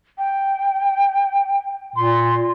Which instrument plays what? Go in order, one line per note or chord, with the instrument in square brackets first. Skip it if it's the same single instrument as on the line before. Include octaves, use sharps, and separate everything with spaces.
[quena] G5
[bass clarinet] A#2 [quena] C6